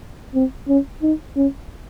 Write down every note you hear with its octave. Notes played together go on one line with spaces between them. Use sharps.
C4
C#4
D#4
C#4